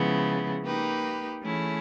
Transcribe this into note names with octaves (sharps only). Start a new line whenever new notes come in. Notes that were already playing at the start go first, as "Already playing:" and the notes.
Already playing: C#3 F3 G#3 B3 E4
A#3 D#4 G4 B4
E3 A3 C#4 E4 G#4